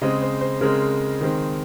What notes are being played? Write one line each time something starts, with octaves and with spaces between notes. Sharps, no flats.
C#3 G#3 C4 D#5
C5
C5
C#3 G#3 C4 A#4
D#3 G#3 C4